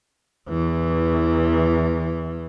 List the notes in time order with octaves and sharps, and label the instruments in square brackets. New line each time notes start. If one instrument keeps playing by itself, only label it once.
[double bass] E2 E3